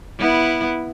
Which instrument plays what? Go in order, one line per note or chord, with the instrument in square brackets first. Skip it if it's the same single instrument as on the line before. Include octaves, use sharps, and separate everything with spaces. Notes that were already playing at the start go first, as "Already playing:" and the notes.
[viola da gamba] B3 E4